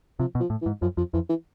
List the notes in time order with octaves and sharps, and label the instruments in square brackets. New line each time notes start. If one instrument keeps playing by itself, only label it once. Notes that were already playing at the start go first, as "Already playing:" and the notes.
[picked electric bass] C3 [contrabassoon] F3
[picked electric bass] B2
[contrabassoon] F3
[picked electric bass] A2
[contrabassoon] E3
[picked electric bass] G#2
[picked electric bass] F#2 [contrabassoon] F3
[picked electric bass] F2 [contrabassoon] F3
[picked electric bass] F2 [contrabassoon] E3
[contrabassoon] E3